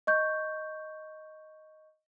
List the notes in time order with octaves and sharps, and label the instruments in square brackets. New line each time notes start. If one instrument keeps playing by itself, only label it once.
[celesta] D#5 C#6 G6